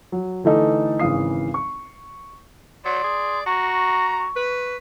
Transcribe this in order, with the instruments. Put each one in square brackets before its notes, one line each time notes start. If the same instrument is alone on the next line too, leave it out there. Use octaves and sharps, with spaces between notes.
[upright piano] F#3
D3 E3 A3 D#4 A4
G#1 C#3 E3 F5 D#6 C7
C#6
[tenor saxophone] F#3 [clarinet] D5 [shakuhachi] C6
[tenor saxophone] G#4
[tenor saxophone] F#4 [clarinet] A#5 [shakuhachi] C#6
[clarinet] B4